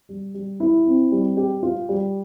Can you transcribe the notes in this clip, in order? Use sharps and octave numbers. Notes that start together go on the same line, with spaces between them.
G3
G3
E4
C4
G3
G4
F4
G3